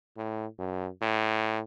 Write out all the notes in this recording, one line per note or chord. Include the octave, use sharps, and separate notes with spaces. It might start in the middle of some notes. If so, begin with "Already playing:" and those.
A2
F#2
A2